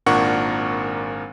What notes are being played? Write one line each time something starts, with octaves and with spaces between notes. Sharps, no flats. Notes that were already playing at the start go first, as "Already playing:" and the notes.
G#1 A#2 D4 A#4 F#5 C#6